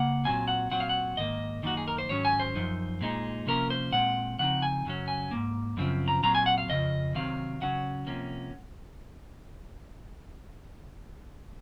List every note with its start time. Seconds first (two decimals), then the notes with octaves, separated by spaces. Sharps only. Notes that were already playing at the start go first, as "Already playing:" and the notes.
Already playing: C#3 A#3 F#5
0.25 A#2 F#3 C4 G#5
0.48 F#5
0.71 A#2 F#3 C4 F#5
0.80 F5
0.89 F#5
1.17 G#2 D#3 A#3 D#5
1.63 F#2 D#3 A#3 D#4 F#4
1.77 G#4
1.88 A#4
1.98 C5
2.09 G#2 D#3 F#3 C#4 C#5
2.25 G#5
2.40 C5
2.55 F#2 F3 D#4
3.01 A#2 G#3 D#4
3.47 C3 F3 A#3 C#4 A#4
3.70 C5
3.93 A#2 G#3 C4 F#5
4.39 C#3 F3 C4 D#4 F#5
4.62 G#5
4.85 F#2 C#3 F#3 C#4
5.08 G#5
5.31 G#2 F#3 A#3
5.77 F#2 C#3 F3 C4
6.08 A#5
6.23 A#2 F#3 C4 A#5
6.35 G#5
6.46 F#5
6.58 F5
6.69 F2 C#3 F3 D#5
7.15 C3 D#3 F#3 C4 F5
7.61 C#3 F#3 C#4 F#5
8.07 C3 F3 A#3 C#4